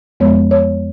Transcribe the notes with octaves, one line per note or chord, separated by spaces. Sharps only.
F2 F3 G#3 B3 C#5
C#5